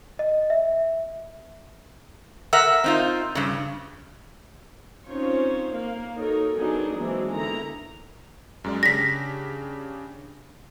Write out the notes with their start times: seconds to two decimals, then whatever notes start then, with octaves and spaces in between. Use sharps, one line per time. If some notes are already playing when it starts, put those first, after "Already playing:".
0.19 D#5
0.50 E5
2.53 A#4 E5 F#5 E6
2.84 C4 D#4 F4
3.35 G2 C#3
5.07 C4 C#4 D#4 F4 C5 C#5
5.70 A#3 F5
6.16 D#4 F#4 A4 A#4 C#5
6.56 F#3 B3 D4 D#4 G#4 A#4
6.96 E3 F#3 G#3 A#3 C4 D4
7.31 D3 D#3 B3 E4 A#5
8.64 F#2 G#3 D5
8.83 C#3 D4 G4 A#6 B6